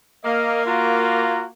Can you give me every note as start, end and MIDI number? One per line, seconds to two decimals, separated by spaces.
0.25 1.47 58
0.25 0.66 75
0.25 0.66 77
0.66 1.46 65
0.66 1.46 66
0.66 1.46 82